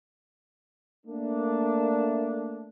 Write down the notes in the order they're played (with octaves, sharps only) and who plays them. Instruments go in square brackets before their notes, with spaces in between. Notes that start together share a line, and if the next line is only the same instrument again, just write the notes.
[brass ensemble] A3 A#3 D4